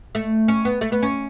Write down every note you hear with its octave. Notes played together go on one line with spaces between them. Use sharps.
A3
C#4
B3
A3
B3
C#4